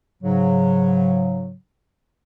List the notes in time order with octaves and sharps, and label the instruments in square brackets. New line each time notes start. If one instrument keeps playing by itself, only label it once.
[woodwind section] G#2 C#3 F#3